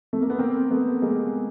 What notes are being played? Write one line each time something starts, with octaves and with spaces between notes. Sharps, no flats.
A3
A#3
B3
A#3 C4
A3 B3
G#3 A#3